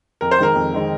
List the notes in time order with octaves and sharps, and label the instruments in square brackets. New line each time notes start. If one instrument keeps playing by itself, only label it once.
[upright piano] F2 [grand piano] A#4
[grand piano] C5
[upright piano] D#3 G#3 C4 D#4 [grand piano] A#4
[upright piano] F2
D#3 G#3 C4 D#4